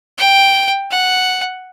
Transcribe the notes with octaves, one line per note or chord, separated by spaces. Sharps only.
G5
F#5